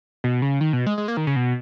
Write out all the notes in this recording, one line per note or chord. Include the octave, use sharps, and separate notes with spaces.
B2
C#3
D#3
B2
G#3
G#3
A#3
D#3
C#3
B2